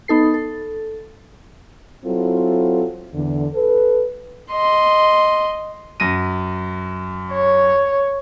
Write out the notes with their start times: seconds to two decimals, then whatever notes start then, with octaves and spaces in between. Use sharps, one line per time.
0.08 B3 D#4 A4 C7
0.34 A4
2.05 F#3 C4 E4 F4 A4
3.14 E2 D3
3.54 A4 B4
4.51 D#5 C6
6.00 F#2 A#6 D#7
7.32 C#5